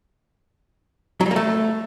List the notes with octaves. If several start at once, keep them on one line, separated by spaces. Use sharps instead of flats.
F#3
G3
A#3
A3